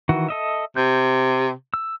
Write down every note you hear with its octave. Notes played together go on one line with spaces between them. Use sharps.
D#3 E3 F#4
A4 D#5 E5
C3 G6
E6